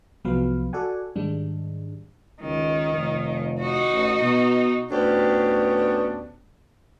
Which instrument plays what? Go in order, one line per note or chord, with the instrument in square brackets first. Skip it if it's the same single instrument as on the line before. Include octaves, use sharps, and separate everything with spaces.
[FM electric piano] C2 F3 F#3 B3 B4 F5
F#4 A4 D5 F#5 G#5
G#2 D#3 G3 G#3 D4
[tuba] C#2 [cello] D#3
[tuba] F1
[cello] D#4 F#4
[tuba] A1
B2
[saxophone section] D2 A2 B3 C#4 D4 G4